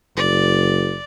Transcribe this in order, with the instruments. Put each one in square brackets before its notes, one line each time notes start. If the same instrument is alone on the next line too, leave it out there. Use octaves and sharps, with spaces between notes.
[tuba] F#1 [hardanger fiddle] D5